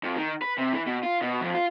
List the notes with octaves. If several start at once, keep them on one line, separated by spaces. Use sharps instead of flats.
F2
D#3
B4
C3
E3
B2
F4
B2
F2
F4